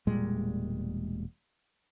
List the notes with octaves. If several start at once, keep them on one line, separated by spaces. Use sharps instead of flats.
E1 A#2 G3 G#3